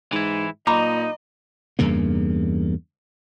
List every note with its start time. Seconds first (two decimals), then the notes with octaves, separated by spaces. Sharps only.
0.12 G#2 E3 E4
0.67 A#2 D#4 D#5 A#5 B5 D6
1.79 E2 G2 C#3 A#3